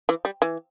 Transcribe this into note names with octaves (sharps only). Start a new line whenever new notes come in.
E3
G3
E3